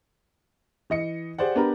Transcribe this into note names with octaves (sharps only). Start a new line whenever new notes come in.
E3 D#5 C#7
G4 G#4 C5 D5 F#5
B3 D4 G4 A#4 B4 A#5